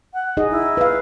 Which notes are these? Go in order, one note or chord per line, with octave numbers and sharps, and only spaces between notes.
F#5
D#4 G#4 D#5
E4
B4 F5